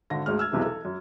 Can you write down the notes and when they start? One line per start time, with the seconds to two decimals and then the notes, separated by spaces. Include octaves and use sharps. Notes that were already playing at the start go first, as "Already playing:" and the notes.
0.10 G#1 D3 A#6
0.26 D2 G#2 G#3 F6
0.39 E6 F6 G#6
0.52 B1 E2 C3 E3 G3 G#3
0.66 A4
0.85 F#2